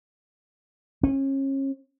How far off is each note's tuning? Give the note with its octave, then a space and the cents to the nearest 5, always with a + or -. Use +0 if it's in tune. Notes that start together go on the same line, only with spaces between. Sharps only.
C#4 -35